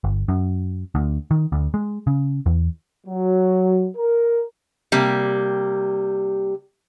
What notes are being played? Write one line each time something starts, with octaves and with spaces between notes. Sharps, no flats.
G1
F#2
D2
D#3
D2
G#3
C#3
E2
F#3
A#4
C3 G3 A#3